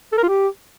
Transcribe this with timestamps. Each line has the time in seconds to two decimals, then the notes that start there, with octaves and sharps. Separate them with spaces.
0.12 A4
0.18 A#4
0.23 F4
0.29 G4